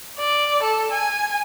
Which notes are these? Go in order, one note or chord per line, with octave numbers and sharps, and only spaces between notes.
D5
A4
G#5